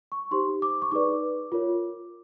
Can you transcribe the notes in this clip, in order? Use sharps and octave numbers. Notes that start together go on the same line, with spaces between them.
C#6
D#4 G4 C5 C6
D6
C#6
D#4 G#4 B4 D5 D6
F4 A#4 C#5